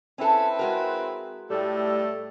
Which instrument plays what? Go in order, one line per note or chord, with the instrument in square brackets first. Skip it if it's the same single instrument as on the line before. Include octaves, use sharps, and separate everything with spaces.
[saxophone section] C4 E4 B4 [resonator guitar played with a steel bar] C#4 A4
[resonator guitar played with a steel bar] G#3 F#4 A#4
[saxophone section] A2 G3 A3